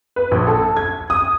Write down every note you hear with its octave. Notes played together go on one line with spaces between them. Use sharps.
B4
A#1
A4
G#6
D#6